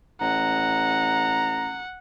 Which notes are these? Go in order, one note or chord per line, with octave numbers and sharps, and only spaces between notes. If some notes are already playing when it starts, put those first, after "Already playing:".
A1 F#5 A#5